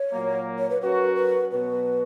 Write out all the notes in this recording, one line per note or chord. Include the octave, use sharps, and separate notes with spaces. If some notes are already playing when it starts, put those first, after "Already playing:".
Already playing: C#5
A#2 F#3 A#3
C#5
B4
F#3 C#4 F#4 A#4 B4
B4
B2 F#3 B3 F#4 B4